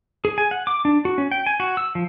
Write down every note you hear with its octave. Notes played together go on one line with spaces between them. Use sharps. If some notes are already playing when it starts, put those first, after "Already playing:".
G#4
G#5
F#5
D6
D4
F#4
C#4
G5
G#5
F#4
E6
F3